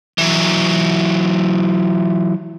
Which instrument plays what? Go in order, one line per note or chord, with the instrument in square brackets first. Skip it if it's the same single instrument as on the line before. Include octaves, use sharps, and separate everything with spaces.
[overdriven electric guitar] E3 F#3